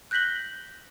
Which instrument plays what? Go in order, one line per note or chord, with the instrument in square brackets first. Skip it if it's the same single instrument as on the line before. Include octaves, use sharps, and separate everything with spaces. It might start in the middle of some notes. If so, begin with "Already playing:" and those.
[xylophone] F#6 G6 A#6 B6 F#7 G7